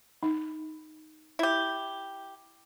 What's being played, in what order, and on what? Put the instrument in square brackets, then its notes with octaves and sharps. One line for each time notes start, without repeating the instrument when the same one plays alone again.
[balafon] D#4
[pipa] E4 G4